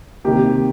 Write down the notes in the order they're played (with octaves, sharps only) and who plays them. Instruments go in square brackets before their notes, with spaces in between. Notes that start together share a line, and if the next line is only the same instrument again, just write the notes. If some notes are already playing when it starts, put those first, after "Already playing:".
[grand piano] C3 D#3 A#3 G4